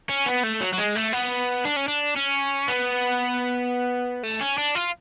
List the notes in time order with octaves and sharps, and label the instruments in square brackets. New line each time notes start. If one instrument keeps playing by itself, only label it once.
[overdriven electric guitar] C#4
B3
A3
F#3
F#3
G#3
A3
B3
D4
C#4
D4
C#4
B3
A3
C#4
D4
F4